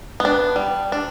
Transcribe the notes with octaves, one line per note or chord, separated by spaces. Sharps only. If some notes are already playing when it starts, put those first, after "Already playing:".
B3 D4
G3
D4